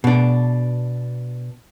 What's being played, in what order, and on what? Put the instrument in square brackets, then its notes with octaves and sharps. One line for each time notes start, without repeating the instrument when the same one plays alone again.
[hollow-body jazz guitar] B2 D4